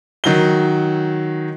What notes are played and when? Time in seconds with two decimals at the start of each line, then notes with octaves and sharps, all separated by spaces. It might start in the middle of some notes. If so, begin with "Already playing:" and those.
0.24 D#3 F#3 G7